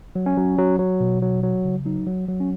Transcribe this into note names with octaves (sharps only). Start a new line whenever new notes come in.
F#3
C#4
F#3
F#3
F#3
B2
F#3
F#3
C#3
F#3 D#4
F#3
F#3
C#4